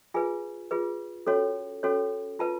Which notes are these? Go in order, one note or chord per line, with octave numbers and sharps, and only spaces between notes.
F4 G#4 B4 G#5
F4 G#4 B4
C#4 F#4 A4 C#5
C#4 F#4 A4 C#5
F4 B4 A5